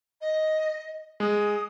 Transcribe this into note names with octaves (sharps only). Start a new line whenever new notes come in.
D#5
G#3 D#6